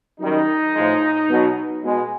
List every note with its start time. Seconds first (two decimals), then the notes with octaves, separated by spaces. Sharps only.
0.20 F#2 D#3 G3 D#4
0.75 A2 F3 G#3
1.29 B2 F#3
1.84 B2 G#3